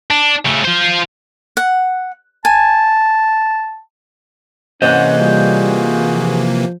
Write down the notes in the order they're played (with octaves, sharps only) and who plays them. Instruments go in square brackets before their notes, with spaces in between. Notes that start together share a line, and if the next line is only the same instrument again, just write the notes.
[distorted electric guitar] D4
C#3 A3
F4 C5
[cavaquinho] F#5
[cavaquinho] G#5 [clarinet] A5
[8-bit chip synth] C3 E3 A#3 [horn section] C#4 F#5 [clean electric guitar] C5 D#5
[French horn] G3 [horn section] F4 F#4 G#4
[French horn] F3